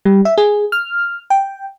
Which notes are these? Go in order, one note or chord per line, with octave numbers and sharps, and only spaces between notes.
G3
E5
G#4
F6
G5